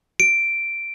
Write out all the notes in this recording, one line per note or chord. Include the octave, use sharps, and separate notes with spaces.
D7